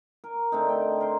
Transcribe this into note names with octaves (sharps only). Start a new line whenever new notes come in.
A#4
D3 A3 C4 D#4
G5
A#4 C6